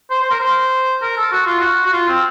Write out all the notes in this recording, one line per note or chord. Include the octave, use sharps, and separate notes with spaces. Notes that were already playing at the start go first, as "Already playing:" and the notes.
C5
C5
A#4
C5
A#4
A4
F#4
F4
F#4
F#4
F4
C4